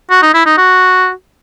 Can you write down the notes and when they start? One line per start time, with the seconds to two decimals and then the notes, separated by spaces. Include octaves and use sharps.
0.10 F#4
0.22 D#4
0.34 E4
0.46 D#4
0.58 F#4